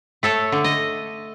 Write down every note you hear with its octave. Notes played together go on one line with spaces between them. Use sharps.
A3 A4 C#5
D3
D#5